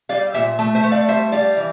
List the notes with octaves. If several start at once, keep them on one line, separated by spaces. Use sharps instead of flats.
G3 D5 F5
A#2 C5 E5
A3
C5 E5
A3
D5 F5
G3 C5 E5
G3 D5 F5
E3